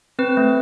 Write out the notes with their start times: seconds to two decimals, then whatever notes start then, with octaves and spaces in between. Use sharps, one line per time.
0.19 C4 B4
0.37 A3